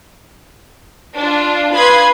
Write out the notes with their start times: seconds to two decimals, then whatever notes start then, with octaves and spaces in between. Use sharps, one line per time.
1.17 D4 F4
1.74 B4 F5 B5 C6 D#6 G#6